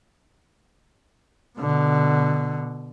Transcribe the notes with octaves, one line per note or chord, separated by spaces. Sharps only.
B2 D3